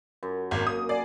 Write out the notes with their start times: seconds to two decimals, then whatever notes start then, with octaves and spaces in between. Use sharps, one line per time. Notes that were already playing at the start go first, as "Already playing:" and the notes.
0.23 F#2
0.51 G#1 A#3
0.67 D#6
0.89 G#4 D5